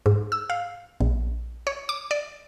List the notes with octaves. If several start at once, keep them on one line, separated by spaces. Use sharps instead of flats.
G#2
E6
F5
A#1
C#5
D6
D5